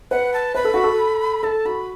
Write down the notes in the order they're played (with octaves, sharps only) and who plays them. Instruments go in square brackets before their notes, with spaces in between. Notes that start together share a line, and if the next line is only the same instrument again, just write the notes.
[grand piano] B4 [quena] F#5
[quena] A5
[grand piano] B4 [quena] B5
[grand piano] A4
F#4
A4
[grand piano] A4 [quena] A5
[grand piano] F#4 [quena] B5